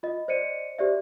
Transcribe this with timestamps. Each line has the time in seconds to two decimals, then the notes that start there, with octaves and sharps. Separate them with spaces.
0.03 F4 D#5
0.28 C5 D5 D#5 C#7 D#7
0.78 G4 C5 D5 E5